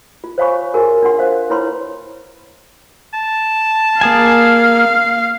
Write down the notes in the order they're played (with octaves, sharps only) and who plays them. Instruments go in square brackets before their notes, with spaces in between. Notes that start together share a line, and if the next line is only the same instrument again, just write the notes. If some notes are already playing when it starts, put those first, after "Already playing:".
[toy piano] F4
C5 C#5 F5 G#5 B5 C#6
F#4 G#4 A#4 G#5
D4 F4 F#5 C6
C5 F5
E4 B4 C#5 B5 C6
[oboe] A5
[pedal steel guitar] A#3 G#4 G#5 [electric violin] F5